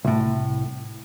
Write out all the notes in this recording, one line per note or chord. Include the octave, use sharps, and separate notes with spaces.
C2 A2